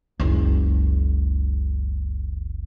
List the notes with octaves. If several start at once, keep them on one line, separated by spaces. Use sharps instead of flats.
F#1 C#2